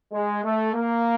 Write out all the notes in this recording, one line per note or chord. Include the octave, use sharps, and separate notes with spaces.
G#3
A3
A#3